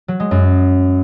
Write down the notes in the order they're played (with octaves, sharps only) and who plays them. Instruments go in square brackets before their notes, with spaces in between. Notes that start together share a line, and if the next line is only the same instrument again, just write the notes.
[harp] F#3
G#3
F#2